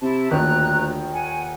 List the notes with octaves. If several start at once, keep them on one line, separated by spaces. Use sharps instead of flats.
C3 E4 A5
D#1 D2 D#3 A#5 F#6
F#5 G#5